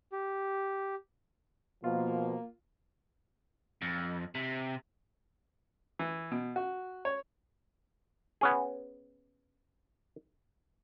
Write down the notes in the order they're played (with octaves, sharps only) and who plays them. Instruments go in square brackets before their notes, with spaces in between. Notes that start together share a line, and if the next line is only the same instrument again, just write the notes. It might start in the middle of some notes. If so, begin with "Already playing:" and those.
[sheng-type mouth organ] G4
[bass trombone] B2 [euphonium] F3 [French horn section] A#3 [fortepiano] F4
[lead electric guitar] F2
C3
[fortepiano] E3
B2
F#4
C#5
[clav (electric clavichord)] B3 C#4 G#4